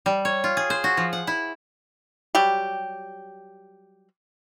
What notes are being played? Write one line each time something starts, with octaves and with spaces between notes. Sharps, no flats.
G3
C#5
F4
G#4
C5
F#4
F3
F#5
E4
F#3 G3 G4